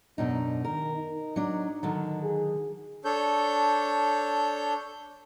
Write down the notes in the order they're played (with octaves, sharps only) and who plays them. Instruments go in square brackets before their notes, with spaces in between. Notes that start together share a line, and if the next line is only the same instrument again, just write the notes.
[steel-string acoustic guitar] F#2 B2 D#4 [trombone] D4
[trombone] D#3 [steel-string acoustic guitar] A#4
[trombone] D#4
[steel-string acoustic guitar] F#3 D4
D3 D#3 F#3
[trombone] G#4
[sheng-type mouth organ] D4 A4 C#5 G6